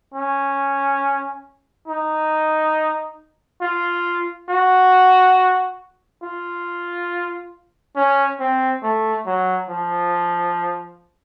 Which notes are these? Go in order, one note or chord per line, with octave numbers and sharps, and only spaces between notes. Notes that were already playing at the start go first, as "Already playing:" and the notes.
C#4
D#4
F4
F#4
F4
C#4
C4
A3
F#3
F3